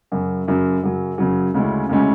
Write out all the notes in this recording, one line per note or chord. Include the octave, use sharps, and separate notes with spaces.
F#2 C#3 F#3
F#2 C#3 F#3
F#2 C#3 F#3
F#2 C#3 F#3
D2 C#3 G#3 C#4 E4
D2 C#3 G#3 C#4 E4